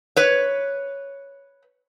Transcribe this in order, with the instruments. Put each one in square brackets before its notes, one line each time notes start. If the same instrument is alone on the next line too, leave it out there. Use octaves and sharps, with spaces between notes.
[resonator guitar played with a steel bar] B4 C#5